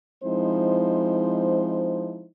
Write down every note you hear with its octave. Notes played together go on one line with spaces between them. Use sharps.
F3 G#3 C4 D#4 E4 C5